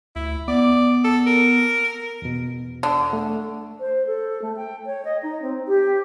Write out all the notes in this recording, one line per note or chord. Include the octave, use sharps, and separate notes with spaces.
D2 E4
B3 D5
A4
A#4
E2 B2
D3
A3
C5
A4
A3
G5
C#5
D#5
D#4
C4
G4